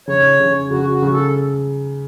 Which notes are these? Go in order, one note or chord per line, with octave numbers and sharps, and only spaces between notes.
C#3 C#5
C#3
C#3 F#4
F#4
C#3
A4